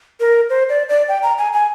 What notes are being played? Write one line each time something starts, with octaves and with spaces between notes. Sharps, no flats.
A#4
C5
D5
D5
G5
A#5
G#5
G#5